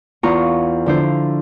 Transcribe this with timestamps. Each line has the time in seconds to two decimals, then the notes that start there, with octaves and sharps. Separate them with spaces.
0.23 E2 F4 A#5 C#6
0.86 D3 F3 D4 E4 C5